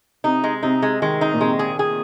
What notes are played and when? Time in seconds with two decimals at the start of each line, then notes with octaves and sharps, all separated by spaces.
0.24 C3 D#4
0.44 G#3
0.63 C3 D#4
0.82 G#3
1.02 D#3 G#3
1.21 D#4
1.34 A#2
1.41 C3 G#3
1.59 G#4
1.79 G#4